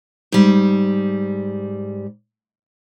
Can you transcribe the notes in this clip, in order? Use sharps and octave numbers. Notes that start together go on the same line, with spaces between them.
G#2 G3